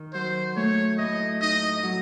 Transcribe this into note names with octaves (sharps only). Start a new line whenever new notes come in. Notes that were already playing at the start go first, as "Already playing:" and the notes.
Already playing: D#3
F#3 C5
A3 C#5
A2 D#5
D#4 D#5
F#3